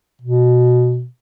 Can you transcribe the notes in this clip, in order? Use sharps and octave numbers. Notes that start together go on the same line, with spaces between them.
B2